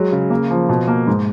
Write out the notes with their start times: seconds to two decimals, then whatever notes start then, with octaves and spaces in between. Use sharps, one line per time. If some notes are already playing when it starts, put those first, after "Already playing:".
Already playing: F#3 G#3
0.12 C#3
0.30 A#3
0.51 F3
0.69 B2
0.88 A#3
1.07 G#2